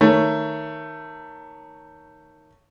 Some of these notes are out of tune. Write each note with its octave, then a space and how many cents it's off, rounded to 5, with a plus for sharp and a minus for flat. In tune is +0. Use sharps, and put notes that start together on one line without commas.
D#3 +0 A3 +20 C#5 +0